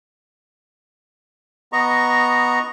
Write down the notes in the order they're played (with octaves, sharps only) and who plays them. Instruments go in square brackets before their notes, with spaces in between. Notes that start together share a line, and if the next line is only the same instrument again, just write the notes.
[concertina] B3 D#5 A#5 C#6